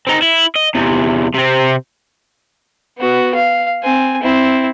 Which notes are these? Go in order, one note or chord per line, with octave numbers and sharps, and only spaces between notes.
C4 D#4
E4
D#5
E2 C3
C3 C4
B3 F#4
F5
C4 G#5
C4 E4